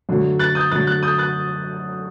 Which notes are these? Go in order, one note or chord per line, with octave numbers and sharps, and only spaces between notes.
F#2 D3 F#3 A3
F#6 A6
D#6 G6
F#2 D3 F#3 A3 F#6 A6
F#6 A6
D#6 G6
F#6 A6